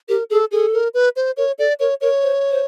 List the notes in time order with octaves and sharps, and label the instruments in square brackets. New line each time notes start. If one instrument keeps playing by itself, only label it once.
[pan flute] G4 [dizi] A#4
[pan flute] G#4 [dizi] A4
[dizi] G#4 [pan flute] A4
[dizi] A#4
B4
C5
[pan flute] A#4 [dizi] C#5
[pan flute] A4 [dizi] D5
[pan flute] A#4 [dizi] C#5
[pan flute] A#4 [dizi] C#5
[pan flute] C5
C5